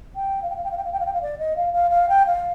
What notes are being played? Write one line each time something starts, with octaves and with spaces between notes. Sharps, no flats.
G5
F5
G5
F5
G5
F5
G5
F5
G5
F5
G5
F5
D5
D#5
F5
F5
F5
G5
F5